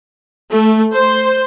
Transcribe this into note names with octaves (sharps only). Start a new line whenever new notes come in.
A3
C5